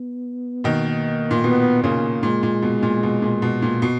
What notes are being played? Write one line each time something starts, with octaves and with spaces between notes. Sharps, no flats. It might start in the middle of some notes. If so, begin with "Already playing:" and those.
Already playing: B3
B2 D#3 A#3
A#2
B2 B3
A#2 C#3 A#3
A#2 G#3
A#2
B2
A#2
B2
A#2
B2
A#2
B2